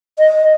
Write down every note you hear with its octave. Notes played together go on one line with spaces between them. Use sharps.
D#5